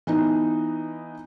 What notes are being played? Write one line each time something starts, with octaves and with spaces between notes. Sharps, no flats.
E3 B3 D#4